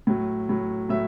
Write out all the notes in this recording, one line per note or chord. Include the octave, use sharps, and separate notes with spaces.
A2 F#3
A2 F#3
A2 F#3 E5